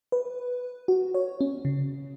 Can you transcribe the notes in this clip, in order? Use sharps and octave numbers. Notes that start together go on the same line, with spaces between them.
B4
F#4
C#5
C#4
C#3